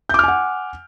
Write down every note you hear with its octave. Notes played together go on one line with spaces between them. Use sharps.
F#5 G#5 D6 F6 G6